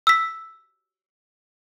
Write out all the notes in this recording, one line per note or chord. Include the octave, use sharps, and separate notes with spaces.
E6 B6